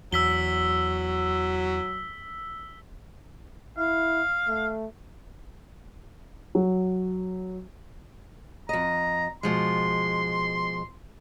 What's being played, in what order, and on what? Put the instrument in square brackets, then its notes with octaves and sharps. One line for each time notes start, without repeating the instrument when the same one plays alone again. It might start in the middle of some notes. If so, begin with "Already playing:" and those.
[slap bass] E2 [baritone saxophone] F#3 [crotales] E6 B6 G7
[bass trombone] E4 [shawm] F5
[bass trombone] A3
[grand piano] F#3
[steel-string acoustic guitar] F2 D#5 [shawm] A#5
[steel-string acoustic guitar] B2 F3 G#3 [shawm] C6